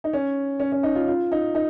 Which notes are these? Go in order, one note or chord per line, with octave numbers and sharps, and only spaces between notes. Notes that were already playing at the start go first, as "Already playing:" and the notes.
D#4
C#4
C#4
C#4
D#4
F4
F4
D#4
D#4